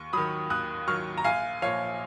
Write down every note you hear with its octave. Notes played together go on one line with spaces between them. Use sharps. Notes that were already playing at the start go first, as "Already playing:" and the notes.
Already playing: D#2 C#6
D#3 F#3 B5 D#6
D#2 D#6 F#6
D#3 F#3 C#6 F6
A#5
A#1 F5 G#5
A#2 F3 C#5 F5